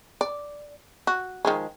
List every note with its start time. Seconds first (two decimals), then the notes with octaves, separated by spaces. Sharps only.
0.21 D5
1.07 F#4
1.45 D#3 F3 G#3